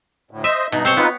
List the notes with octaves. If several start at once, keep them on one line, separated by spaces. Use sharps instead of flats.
D2 A2
C5 D#5 E5
G2 B2 D#4
G2 C3 C4 C5 C#5
B3 D#4 F4 B4